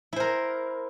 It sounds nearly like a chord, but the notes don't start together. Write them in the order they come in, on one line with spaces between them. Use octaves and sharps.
E4 C5 A#4